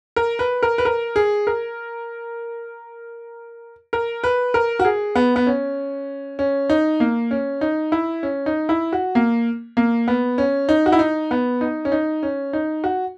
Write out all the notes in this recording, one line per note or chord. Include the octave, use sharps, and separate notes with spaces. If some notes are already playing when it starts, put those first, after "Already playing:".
A#4
B4
A#4
B4
A#4
G#4
A#4
A#4
B4
A#4
F#4
G#4
B3
B3
C#4
C#4
D#4
A#3
C#4
D#4
E4
C#4
D#4
E4
F#4
A#3
A#3
B3
C#4
D#4
F#4
E4
D#4
B3
D#4
C#4
D#4
C#4
D#4
F#4